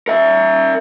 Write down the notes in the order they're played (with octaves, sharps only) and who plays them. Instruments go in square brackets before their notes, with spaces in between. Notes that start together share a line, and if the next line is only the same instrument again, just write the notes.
[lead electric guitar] A#4 E5